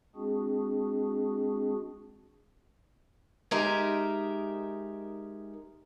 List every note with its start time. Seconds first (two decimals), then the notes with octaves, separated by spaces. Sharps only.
0.15 G#3 C4 D4 F#4 G#4
3.51 G#3 D#4 G4 A#4 E5